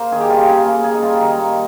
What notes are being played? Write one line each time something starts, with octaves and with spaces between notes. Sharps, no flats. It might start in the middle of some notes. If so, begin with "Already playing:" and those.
Already playing: A#3 A#4 C5
D#3 G#4
G4
G3 F4
G4
C#3 G#4
A#3
C#3 G#4
D#4
G3 F4
D#3 D#4
A#3